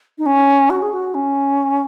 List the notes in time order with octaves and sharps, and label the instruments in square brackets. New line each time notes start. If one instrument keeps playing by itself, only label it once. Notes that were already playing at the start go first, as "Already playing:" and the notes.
[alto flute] D#4
C#4
F#4
G#4
F#4
C#4